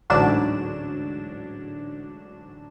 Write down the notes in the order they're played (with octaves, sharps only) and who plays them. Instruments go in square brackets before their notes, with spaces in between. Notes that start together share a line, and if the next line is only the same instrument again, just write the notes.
[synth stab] A1 D2 G#2 F#3 D4 E7